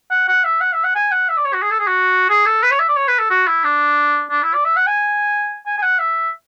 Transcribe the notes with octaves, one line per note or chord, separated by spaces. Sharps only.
F#5
F#5
E5
F#5
E5
F#5
G#5
F#5
E5
D5
C#5
F#4
G#4
A4
G#4
F#4
G#4
A4
B4
C#5
E5
D5
C#5
B4
A4
F#4
E4
D4
D4
E4
D5
E5
F#5
G#5
G#5
G#5
F#5
E5